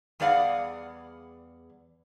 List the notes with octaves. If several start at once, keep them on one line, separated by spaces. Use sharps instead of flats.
E2 G3 G#4 D5 F5 F#5